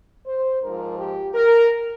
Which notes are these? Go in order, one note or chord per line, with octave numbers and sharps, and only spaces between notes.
C5
G#2 F3 A#4
G4
A#4